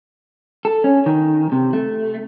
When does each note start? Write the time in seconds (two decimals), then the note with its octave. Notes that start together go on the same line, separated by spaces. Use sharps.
0.65 A4
0.84 C#4
1.06 D#3
1.52 C3
1.73 A3